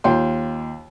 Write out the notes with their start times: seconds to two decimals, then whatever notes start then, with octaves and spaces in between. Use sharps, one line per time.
0.04 D#2 F4 G5 C6